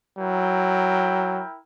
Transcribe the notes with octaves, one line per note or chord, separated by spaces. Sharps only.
F#3 E4 A#4 G5